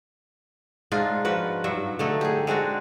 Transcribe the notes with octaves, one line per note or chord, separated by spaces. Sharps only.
G#2 D4 D#4 F4
F3 F#4 B4
G2 F#3 E5
D3 A3 D#4
G4 G#4
G#3 C4 D4 F#4